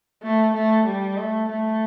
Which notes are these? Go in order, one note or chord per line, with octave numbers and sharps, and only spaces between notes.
A3
A3
G3
A3
A3